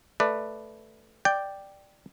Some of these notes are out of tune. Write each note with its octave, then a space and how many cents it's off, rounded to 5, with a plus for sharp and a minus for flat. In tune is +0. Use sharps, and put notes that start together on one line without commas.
A3 +0 B4 +0 D5 +15
D5 +5 G5 +0